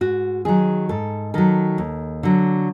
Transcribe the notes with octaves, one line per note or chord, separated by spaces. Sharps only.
G#2 F#4
D#3 F#3 G#4
G#2 A4
D#3 F#3 A4
D#2
D3 F#3